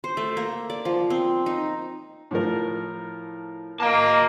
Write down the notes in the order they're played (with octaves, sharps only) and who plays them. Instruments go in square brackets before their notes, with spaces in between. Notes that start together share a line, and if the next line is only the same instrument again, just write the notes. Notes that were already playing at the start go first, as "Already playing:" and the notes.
[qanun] C5
A3
A#3
D5
F3
C4
D#4
[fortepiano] A2 F3 A#4
[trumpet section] A#3 [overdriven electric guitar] D#5 A5